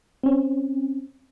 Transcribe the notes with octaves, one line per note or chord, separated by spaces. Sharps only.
C4 C#4